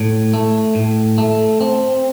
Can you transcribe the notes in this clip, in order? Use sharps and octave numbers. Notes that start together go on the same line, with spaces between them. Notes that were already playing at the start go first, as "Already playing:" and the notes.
Already playing: A2
A3
A2
A3
C4